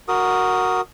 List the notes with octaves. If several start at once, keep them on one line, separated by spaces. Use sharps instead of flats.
F#4 A#4 D#6